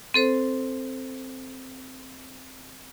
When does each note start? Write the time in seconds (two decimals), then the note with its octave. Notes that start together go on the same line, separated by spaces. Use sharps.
0.14 C4 A4 C5